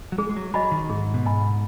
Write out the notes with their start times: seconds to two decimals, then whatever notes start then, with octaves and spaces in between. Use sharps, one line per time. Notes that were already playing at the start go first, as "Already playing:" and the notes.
0.12 F#3
0.18 G#3 G#4
0.29 G#3
0.36 F#3
0.54 F#3 D#5 G#5 B5
0.71 D#3
0.90 G#2 G#4
1.14 B2
1.25 G#2 D#5 G#5 B5